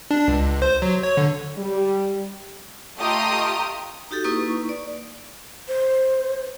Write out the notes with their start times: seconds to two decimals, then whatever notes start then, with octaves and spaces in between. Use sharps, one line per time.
0.11 D4
0.28 C#2
0.62 C5
0.82 F#3
1.03 C#5
1.17 D3
1.57 G3
2.99 A3 F4 G4 D#5 A#5 D#6
4.11 D#4 F#4 G4 A4
4.24 A#3 D#4 E4 B4 C#6 D#6
4.69 D5
5.68 C5